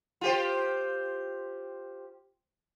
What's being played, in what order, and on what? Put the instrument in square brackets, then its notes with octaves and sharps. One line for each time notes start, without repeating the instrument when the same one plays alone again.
[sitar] F4 G4 C5